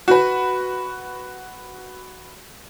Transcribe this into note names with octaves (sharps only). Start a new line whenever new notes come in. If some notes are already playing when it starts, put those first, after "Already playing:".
F#4 B4